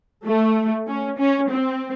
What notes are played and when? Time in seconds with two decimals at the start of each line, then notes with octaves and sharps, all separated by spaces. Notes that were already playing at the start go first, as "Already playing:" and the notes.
0.25 A3
0.87 C#4
1.18 C#4
1.49 C4